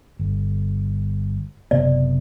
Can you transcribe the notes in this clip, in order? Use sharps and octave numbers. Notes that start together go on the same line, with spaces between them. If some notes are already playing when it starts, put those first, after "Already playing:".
G1
F#1 C3 B3 D5